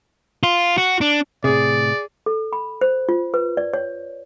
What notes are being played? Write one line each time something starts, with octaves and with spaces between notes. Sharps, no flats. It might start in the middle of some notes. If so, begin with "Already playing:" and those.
F4
F#4
D4
A2 C3 G#4 D5
A4
B5
C5
F4
B4
D5
C#5